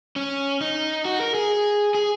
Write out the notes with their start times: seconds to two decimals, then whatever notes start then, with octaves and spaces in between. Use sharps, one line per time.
0.16 C#4
0.61 D#4
1.05 F#4
1.21 A#4
1.34 G#4
1.95 G#4